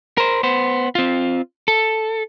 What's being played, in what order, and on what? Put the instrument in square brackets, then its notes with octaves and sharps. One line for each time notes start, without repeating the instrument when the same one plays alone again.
[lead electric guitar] A#4 C5
B3 C5
C4 F4
A4